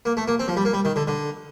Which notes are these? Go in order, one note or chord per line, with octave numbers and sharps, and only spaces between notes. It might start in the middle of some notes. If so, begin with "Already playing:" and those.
A#3
A3
A#3
C4
F3
G3
A#3
G3
D#3
D3
D3